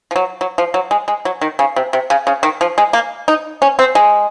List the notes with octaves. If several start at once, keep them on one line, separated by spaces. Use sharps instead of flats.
F3
F#3
F#3
F3
F#3
G#3
G#3
F#3
D#3
C#3
C3
C3
C#3
C#3
D#3
F3
G#3
A#3
D#4
C#4
C4
G#3